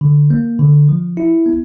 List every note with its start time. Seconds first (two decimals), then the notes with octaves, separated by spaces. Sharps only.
0.01 D3
0.30 A#3
0.59 D3
0.89 F3
1.17 E4
1.46 B3